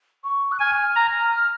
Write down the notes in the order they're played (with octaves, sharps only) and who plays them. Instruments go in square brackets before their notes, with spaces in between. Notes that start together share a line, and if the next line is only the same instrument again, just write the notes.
[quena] C#6
F#6
[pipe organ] G#5 [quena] F6
[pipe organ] A#5
[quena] F6